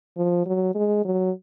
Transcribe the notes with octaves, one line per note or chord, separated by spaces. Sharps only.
F3
F#3
G#3
F#3